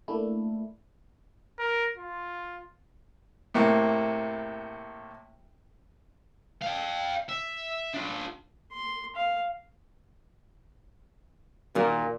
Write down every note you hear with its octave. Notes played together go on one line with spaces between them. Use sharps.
A3 A#3 D4 E4
A#4
F4
A2 C3 A#3
F5 G5
E5
D4 F4
C6
F5
A#2 D#3 F#4 A#4